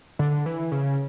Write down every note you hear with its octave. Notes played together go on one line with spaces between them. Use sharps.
D3
E3
C#3